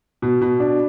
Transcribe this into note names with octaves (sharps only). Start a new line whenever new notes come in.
B2
B2
D4